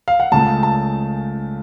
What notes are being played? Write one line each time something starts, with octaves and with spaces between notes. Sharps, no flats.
F5
F#5
C#2 C#3 A3 A5
A5